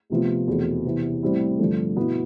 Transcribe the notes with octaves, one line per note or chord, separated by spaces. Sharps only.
D2 C3 F3 B3 F4
E2 B2 A3 C4
C3 E3 B3
A2 G3 C4 E4
G2 D3 F3 A3
B2 B3 E4